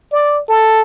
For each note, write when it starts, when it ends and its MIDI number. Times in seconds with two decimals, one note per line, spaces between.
0.12 0.41 74
0.49 0.82 69